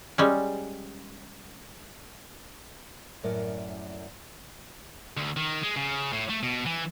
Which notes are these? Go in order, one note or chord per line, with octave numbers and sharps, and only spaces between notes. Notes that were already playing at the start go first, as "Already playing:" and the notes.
G3 G#3 C#4
F#2 A2 A#4 D5 F#5 G#5
D2
D#3
G#3
C#3
A2
A3
B2
E3